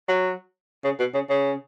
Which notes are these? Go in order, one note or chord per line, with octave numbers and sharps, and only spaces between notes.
F#3
C#3
B2
C#3
C#3